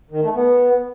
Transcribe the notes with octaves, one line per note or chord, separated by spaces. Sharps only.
D#3
A3
B3